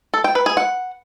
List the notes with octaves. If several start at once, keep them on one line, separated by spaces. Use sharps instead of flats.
A4
G5
B4
G#4
F#5